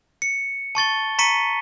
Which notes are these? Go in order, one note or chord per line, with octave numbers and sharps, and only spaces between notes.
C#7
A5 C#6 A6 G7
A#5 C#6 B6 C#7 D#7